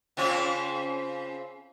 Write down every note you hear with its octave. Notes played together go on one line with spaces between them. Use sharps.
C#3 C4 F4